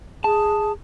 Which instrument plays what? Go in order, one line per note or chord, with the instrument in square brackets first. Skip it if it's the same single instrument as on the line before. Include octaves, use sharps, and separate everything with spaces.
[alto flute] G#4 [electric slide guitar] A5